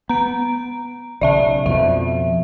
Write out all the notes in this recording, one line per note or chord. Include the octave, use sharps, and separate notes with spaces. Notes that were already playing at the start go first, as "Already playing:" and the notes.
B3 A#5 D7
B1 C#3 D5 E5 A5
F2 B2 F3 E5